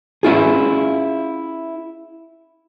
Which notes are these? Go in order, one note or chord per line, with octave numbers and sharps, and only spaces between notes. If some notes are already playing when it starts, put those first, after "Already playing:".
C#4 E4 F4 G#4